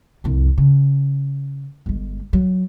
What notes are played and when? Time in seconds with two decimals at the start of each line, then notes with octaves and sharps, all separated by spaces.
0.24 C2 F2
0.58 C#3
1.86 G1 G#3
2.33 F#3